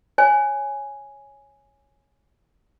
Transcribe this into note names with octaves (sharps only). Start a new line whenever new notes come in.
C#5 G#5